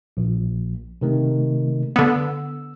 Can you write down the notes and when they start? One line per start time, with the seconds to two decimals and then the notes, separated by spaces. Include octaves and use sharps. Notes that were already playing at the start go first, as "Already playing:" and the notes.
0.17 A#1
1.01 C3 D#3 A3
1.96 D3 B3 E6